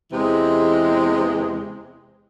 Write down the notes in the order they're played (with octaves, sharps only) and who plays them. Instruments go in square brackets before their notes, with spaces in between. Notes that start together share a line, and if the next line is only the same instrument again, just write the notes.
[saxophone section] E2 C3 E3 G#3